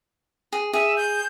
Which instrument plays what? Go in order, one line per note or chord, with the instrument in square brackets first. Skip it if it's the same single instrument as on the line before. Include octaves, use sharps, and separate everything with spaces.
[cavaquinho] G#4
[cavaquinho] G#4 [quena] E5
[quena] G6